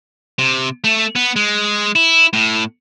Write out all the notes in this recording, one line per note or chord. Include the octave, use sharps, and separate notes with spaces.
C3
A3
B3
G#3
E4
A2